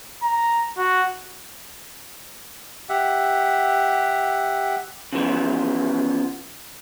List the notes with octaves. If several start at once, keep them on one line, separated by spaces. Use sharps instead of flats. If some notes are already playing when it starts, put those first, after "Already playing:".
A#5
F#4
G4 E5 F#5
C#3 E3 F3 B3